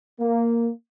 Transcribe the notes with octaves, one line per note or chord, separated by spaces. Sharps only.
A#3